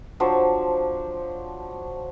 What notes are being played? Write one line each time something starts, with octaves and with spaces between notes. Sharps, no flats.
F3 F#3 D4 C5